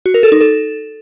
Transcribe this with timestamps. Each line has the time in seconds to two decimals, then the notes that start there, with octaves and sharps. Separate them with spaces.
0.06 F#4
0.14 A#4
0.23 A4
0.32 D#4
0.41 A4